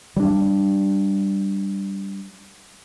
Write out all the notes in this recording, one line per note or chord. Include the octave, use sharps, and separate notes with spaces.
G3 D4